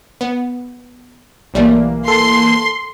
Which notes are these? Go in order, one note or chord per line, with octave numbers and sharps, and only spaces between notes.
B3
B1 E3 G3 A3 A#3
A4 C6